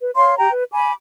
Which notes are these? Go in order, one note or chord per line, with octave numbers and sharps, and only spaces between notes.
B4
C#5 F5 C6
G4 G5 A#5
B4
G#5 B5 D6